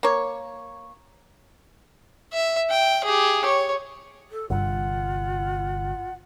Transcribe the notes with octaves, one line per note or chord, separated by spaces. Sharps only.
A#3 C#5
E5
G5
G4 G#4
C#5
A4
G1 G2 C3 F4 F#5